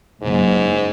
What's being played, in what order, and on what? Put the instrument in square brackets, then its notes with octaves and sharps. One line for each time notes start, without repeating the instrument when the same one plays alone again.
[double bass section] F#1 [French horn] G#2